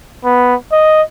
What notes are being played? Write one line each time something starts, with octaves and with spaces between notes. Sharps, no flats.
B3
D#5